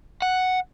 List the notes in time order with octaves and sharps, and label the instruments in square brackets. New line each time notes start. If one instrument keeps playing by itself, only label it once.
[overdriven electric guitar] F#5